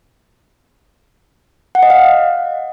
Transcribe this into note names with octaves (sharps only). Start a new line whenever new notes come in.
F#5
D#5
F5